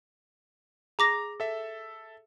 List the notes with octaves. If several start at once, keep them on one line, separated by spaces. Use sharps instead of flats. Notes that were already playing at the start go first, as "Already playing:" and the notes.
G#4 A#5 D6 A#6
A4 E5